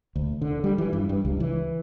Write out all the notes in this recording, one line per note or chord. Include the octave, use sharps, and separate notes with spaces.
D2
D3
G3
E3
G2
G2
C#2
E3